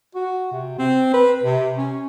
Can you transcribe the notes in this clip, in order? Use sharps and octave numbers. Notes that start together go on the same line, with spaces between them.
F#4
C3
C4
B4
C3
C#4